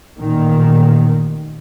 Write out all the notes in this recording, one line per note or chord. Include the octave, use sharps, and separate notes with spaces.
A1 A#2 D#3